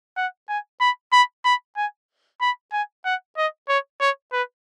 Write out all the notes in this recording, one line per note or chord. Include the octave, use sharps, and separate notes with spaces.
F#5
G#5
B5
B5
B5
G#5
B5
G#5
F#5
D#5
C#5
C#5
B4